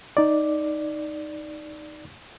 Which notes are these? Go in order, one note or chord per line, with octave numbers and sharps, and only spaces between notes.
D#4 D5